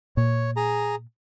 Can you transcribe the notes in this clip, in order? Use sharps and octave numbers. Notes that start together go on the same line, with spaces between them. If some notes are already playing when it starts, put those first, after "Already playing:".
A#2 C#5
G#4 A#5